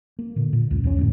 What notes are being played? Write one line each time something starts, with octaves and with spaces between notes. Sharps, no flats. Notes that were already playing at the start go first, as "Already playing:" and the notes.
A#3
A#2 D3
A#2
C#2 F#2
E2 A#3 C#4
E1 D2 A2